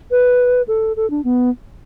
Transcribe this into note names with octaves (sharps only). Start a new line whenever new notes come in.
B4
A4
A4
D4
B3